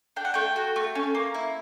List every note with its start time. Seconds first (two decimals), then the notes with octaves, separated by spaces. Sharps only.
0.16 D4 G5
0.25 F#5
0.34 A3 G5
0.56 F#4
0.76 A3
0.95 C#4
1.15 A#3
1.34 E4